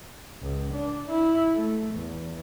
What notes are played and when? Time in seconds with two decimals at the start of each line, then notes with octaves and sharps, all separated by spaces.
0.42 C#2
0.73 D4
1.10 E4
1.54 A3
1.93 E2